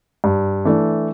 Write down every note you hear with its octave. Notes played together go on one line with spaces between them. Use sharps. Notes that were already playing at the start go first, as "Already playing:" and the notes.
G2
E3 A3 D4